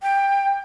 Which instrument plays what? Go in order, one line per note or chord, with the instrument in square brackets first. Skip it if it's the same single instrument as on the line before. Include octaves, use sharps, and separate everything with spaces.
[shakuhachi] G5